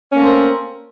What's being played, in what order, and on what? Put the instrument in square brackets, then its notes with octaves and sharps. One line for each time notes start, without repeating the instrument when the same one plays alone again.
[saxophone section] C#4
A#3
A3
C4
A#4